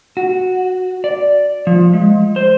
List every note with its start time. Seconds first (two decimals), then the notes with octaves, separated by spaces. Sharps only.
0.17 F#4
1.04 D5
1.67 F3
1.93 G#3
2.36 C5